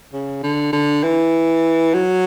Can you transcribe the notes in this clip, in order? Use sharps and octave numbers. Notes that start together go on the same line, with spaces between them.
C#3
D3
D3
E3
F#3